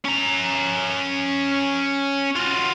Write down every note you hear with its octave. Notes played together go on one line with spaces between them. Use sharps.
C#4 A#5
F4 F#4